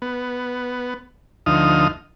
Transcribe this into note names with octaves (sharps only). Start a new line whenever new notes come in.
B3
D2 F3 D#4 D#6 F6